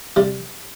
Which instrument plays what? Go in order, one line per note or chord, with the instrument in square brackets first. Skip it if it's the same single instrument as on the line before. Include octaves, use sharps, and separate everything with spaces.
[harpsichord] C3 G3